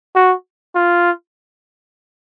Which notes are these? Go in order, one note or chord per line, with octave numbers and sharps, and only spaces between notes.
F#4
F4